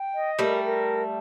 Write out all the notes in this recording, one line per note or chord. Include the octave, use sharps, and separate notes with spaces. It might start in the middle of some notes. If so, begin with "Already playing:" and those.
Already playing: G5
D#5
G3 A3 A#4
A#4